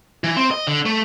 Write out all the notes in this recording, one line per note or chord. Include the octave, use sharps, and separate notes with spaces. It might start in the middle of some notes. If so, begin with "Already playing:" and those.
E3
C4
D#5
D3
A3